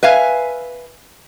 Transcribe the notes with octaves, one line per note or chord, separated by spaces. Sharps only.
B4 E5 F5 G#5